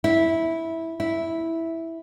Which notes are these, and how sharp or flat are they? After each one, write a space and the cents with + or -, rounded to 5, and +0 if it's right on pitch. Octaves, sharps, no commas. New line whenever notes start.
E4 -10
E4 -5